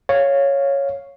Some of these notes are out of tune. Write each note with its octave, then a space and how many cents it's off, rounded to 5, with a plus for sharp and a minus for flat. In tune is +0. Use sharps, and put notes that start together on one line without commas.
C#5 +0 F5 +0